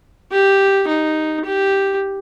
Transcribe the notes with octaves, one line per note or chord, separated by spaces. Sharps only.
G4
D#4
G4